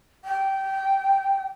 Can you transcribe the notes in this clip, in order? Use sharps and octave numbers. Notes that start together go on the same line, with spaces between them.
G5